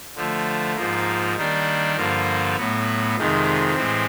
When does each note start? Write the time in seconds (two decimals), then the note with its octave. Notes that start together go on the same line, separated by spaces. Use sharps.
0.16 D3 F3 A3
0.75 G#2 F3 A#3
1.36 D#3 G3 A#3 D4
1.96 G2 D3 F3 A#3
2.56 A2 F#3 B3
3.16 F2 C3 D#3 G#3
3.75 A2 E3 G#3 C4